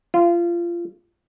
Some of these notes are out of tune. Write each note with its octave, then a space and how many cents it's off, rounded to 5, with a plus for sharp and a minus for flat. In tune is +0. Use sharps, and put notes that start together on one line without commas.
F4 -25